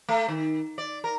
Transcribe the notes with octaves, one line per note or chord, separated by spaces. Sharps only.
A3
D#3
D5
A#4